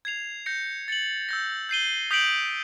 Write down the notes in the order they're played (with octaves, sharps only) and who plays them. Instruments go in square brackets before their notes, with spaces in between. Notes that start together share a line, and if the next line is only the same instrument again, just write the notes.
[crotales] G#6 C7 F7
G6 A#6 C#7
A6 C#7 F#7
E6 G6 A#6
G6 C7 D#7 G7
D#6 G6 B6 D7 F#7